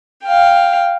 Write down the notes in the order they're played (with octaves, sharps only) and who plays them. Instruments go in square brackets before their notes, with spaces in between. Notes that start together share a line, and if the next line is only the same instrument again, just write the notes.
[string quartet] F5 G5